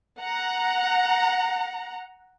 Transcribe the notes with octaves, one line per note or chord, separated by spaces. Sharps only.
F#5 A#5